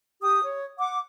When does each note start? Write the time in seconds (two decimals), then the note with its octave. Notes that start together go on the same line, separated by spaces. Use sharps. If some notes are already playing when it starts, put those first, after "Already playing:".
0.21 G4 D#6
0.43 C#5
0.78 F#5 D6